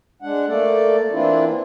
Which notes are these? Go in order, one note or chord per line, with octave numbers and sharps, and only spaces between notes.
G#3 D4 F#5
A3 A#3 A4 D5
E3 A#3 C4 D4 E4 F4